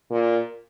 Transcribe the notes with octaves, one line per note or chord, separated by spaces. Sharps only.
A#2